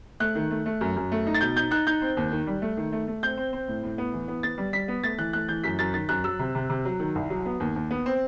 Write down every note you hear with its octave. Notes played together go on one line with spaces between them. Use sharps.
A3 F#6
D#3
A3
A3
F#2
F#2
A3
D#4
A6
B2 G6
D#4 G6
D#4 F#6
D#4 G6
C4
D#2
D#3
G3
A3
D#3
A3
A3
C4 G6
C4
C4
A2
A2
B3
E3
B3
B3 A6
G3
G3 B6
B3
A3 A6
E3 F#6
A3 F#6
E3 G6
F#2 B6
F#2 A6
D#3 A6
F#2 F#6
F#3 E6
C3
C3
C3
F#3
D#3
C2
F#3
B3
D#2
D#2
B3
C4